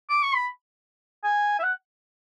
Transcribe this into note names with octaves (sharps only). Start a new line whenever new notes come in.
D6
C#6
B5
G#5
E5
F#5